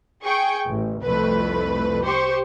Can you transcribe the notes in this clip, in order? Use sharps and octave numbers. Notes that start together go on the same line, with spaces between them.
G#4 G5 C#6
A1
C2 F2 A3 B4
G4 C5 C#6